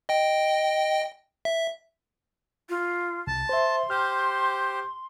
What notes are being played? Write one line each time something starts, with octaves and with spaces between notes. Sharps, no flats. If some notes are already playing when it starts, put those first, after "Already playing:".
D#5 G5
E5
F4
C2 A5
C5 E5 C6
G4 C5 F6